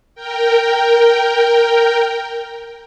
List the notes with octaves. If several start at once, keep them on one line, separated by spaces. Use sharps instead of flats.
A#4 G5